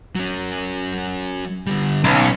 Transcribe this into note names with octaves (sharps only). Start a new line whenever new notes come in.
F#3 C#4
D3 G3
B1 C#4